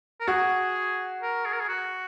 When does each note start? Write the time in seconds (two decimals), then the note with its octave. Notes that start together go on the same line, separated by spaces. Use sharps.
0.20 A#4
0.28 F#4 G#4
1.22 A#4
1.45 G#4
1.53 A#4
1.60 G#4
1.68 F#4